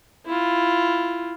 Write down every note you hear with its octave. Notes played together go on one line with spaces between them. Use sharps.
E4 F4